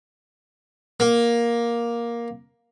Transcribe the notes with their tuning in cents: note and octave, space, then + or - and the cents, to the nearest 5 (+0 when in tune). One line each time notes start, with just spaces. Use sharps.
A#3 +10